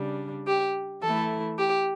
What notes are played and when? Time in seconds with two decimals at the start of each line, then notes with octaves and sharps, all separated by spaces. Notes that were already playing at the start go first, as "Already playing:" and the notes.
Already playing: C#3 G3 D4
0.47 G4
1.03 E3 A3 E4 A4
1.58 G4